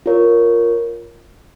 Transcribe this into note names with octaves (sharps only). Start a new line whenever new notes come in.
F4 A#4 C#5